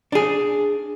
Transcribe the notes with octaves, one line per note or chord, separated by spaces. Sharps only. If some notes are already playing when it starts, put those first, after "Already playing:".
D4 G#4